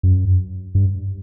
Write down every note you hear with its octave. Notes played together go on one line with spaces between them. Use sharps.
F#2
G2